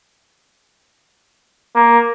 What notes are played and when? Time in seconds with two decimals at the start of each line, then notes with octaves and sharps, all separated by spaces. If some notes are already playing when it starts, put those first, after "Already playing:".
1.75 A#3